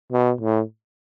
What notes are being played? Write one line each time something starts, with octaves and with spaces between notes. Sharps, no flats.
B2
A2